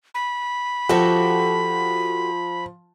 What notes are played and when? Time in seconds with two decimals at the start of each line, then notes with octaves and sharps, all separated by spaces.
0.14 B5
0.89 F3 F#4 G4 A4